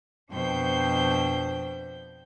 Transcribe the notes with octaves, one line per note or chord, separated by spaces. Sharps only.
F2 B2 D4 C5 G5 G6